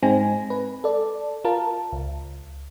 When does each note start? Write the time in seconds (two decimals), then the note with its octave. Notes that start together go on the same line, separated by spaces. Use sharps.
0.02 G#2 G#3 C4 D#4 G#5 A#6
0.50 B4
0.84 A4 D5
1.45 F4 A#4 A5
1.93 C#2